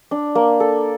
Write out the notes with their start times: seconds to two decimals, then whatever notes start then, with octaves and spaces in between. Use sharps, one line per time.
0.11 D4
0.35 A#3
0.60 A4